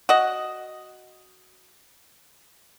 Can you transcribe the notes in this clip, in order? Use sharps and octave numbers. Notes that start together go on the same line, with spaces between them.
F#4 D#5